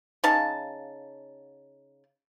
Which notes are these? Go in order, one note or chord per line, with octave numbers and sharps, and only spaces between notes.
C#3 D#4 F5 A5